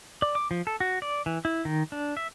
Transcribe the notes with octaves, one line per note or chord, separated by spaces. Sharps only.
D5
D6
F3
A4
F#4
D5
E3
E4
D#3
D4
E5